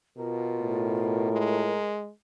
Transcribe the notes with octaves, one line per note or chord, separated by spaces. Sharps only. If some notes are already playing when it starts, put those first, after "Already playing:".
B2 F4 A#4
A2
G#3